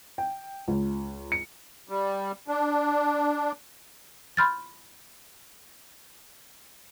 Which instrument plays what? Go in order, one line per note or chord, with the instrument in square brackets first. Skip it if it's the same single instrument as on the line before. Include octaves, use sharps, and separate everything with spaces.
[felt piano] G5
C#2
C#7
[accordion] G3
D4
[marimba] B5 C6 F6 G6 A6